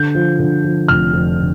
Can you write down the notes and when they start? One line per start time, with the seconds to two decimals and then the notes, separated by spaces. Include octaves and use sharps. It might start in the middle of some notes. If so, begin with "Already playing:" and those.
Already playing: D3 G6
0.15 F3
0.39 D3
0.64 F3
0.88 F1 F6
1.13 F2
1.38 D3